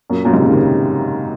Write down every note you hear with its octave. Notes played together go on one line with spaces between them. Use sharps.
F#2 A#2
F#2 A#2
G#2 C3
A#2 C#3
C3 D#3